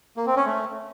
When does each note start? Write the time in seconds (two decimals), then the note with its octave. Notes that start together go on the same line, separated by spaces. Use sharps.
0.17 A#3
0.26 C4
0.36 C#4
0.46 A3